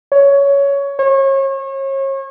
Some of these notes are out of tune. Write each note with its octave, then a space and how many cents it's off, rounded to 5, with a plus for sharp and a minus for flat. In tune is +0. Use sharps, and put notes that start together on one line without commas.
C#5 +15
C#5 -35